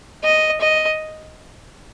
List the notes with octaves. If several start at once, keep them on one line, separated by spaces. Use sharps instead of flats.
D#5
D#5